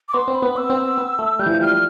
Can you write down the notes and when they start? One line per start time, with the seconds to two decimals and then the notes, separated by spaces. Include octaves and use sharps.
0.09 D6
0.14 B3 C6
0.28 C4
0.35 B5
0.42 B3
0.55 B3 E6
0.70 C4
0.77 B3
0.98 B3
1.19 A3
1.39 G3 G6
1.46 E3
1.50 F3
1.61 G3 F6
1.72 G3